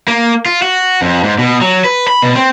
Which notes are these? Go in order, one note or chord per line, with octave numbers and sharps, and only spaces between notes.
A#3
F4
F#4
F2
G#2
B2
F#3
B4
B5
B2
C4